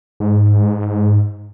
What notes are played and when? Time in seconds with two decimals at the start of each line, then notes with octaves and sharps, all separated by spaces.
0.20 G#2